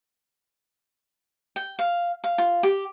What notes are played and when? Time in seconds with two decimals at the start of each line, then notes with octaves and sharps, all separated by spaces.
1.56 G5
1.79 F5
2.24 F5
2.38 F4
2.63 G4